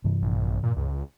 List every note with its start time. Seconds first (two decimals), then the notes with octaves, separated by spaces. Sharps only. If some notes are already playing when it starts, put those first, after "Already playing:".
0.04 G2 C3 E3
0.22 A#1
0.63 A#2
0.77 C#2